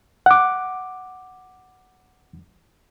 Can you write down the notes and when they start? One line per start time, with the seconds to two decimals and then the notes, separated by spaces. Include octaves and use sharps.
0.26 F#5 D6